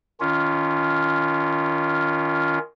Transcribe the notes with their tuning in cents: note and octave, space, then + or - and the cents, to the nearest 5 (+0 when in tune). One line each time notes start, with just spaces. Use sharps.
D#3 +0 C#4 +20 F4 -15